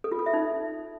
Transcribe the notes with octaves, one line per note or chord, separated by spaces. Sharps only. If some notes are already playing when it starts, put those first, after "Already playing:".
A4
F4
A4
E5
D#4